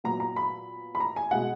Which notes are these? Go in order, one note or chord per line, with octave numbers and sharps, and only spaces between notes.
A#2 F#3 B3 A#5
A#5
B5
B5
A#5
G#5
B2 G#3 F#5